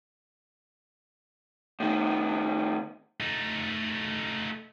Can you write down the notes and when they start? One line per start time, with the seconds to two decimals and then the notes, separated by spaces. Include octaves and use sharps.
1.80 A2 D#3
3.20 A3 D#4